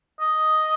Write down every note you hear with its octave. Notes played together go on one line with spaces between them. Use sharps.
D#5